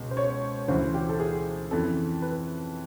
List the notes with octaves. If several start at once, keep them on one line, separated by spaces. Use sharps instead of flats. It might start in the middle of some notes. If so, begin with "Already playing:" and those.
Already playing: C#2 B2
C5
C#5
D2 C#3 E3 C5
G4
A4
G#4
F2 C#3 E3 A4
B4